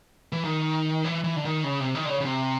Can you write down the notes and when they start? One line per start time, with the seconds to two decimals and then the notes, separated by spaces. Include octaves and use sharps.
0.32 E3
0.44 D#3
1.04 E3
1.24 E3
1.36 D3
1.45 D#3
1.64 C#3
1.80 C3
1.95 D#3
2.05 D3
2.09 C#3
2.21 C#3
2.25 C3